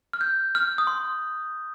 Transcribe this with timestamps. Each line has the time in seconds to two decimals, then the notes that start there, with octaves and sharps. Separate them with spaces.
0.13 F6
0.21 G6
0.55 F6
0.78 D#6
0.87 C6